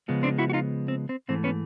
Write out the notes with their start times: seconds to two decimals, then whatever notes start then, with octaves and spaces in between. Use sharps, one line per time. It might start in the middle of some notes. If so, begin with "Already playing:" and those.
0.08 C#3 F3 G#3 B3
0.23 C4 D4
0.38 E4 F#4
0.50 F#4
0.53 D#4 F4
0.88 C4
1.09 C4
1.29 G#2 E3 A3 C4
1.44 B3 C#4